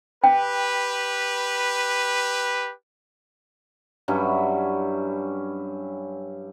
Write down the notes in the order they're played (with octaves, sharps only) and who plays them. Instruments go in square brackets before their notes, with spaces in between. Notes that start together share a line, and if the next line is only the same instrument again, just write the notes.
[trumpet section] G4 B4 [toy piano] G5
[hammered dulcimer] G2 F#3 C#4 E4